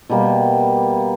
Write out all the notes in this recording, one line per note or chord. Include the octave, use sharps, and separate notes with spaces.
B2 G3 A#3